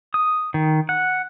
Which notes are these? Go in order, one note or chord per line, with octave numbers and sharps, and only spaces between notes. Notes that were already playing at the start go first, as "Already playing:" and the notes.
D#6
D#3
F#5